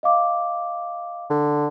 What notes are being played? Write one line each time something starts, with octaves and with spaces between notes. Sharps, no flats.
D#5 F5 D6
D3